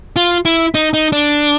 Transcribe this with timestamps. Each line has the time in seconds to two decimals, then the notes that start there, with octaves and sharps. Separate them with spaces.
0.16 F4
0.45 E4
0.75 D#4
0.94 D#4
1.12 D4